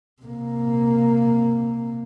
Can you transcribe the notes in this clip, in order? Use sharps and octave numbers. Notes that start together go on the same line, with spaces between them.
C3 A#3